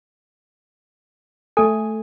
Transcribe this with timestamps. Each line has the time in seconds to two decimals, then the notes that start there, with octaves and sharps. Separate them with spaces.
1.57 A3 A4 G#5